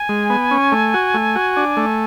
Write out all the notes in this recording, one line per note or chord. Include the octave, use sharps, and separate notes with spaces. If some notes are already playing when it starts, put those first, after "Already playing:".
Already playing: G#5
G#3
B3
C#4
A3
F#4
A3
F#4
D4
A3